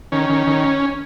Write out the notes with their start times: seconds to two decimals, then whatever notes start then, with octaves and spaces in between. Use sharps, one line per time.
0.12 D#3 C#4
0.30 D#3
0.47 D#3